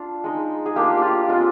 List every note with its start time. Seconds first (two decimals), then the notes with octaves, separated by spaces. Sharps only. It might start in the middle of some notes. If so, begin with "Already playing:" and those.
Already playing: D4 F4
0.24 G#3 D#4
0.66 G#4
0.76 A#3 D4 F4 G4
0.97 F4 G4
1.29 G#3 C4 F4